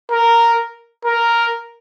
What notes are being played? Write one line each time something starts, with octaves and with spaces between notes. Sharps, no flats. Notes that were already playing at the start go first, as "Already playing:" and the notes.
A#4
A#4